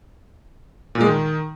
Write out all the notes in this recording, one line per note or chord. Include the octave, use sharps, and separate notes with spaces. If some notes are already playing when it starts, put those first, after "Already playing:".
A#2
G#3
D#3